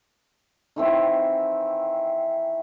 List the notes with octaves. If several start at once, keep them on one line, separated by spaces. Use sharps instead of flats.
D#3 E3 C4 F#4